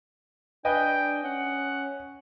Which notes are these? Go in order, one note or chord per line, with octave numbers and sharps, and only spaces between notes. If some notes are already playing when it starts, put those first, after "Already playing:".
D4 B4 D#5 G5 G#5
C#4 F#5